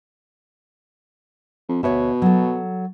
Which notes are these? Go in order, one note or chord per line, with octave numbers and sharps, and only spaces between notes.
F2
D2 B2 C#5 E5
F#3 A4